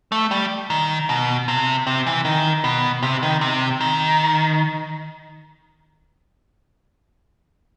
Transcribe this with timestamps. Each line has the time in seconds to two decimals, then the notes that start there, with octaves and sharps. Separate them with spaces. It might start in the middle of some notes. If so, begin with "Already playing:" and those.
0.12 A3
0.31 G3
0.70 D#3
1.09 B2
1.48 C3
1.87 C3
2.07 E3
2.25 D#3
2.64 B2
3.03 C3
3.23 D#3
3.41 C3
3.81 D#3